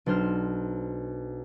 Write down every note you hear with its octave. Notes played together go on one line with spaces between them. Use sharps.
B1 D4 C5 F6